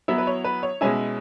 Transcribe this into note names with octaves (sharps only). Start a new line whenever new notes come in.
F#3 B3 E4 E5
B4
C#5
B4
C#5
B2 G#3 C#4 E4 G#5